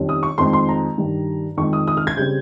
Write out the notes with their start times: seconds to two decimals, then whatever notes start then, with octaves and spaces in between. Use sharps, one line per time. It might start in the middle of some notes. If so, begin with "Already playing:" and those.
Already playing: F2 D#3 G3 C#4
0.09 D#6
0.23 C#6
0.38 F2 D#3 G#3 C4 C6
0.53 C6
0.69 A#5
0.98 G2 D#3 G3
1.57 F2 D#3 G#3 C#6
1.73 D#6
1.87 D#6
1.97 F6
2.07 G#6
2.17 C#3 G3 C4 G6